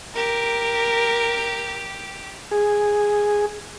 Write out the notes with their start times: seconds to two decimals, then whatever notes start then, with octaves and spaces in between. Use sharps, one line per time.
0.15 G4 A#4
2.51 G#4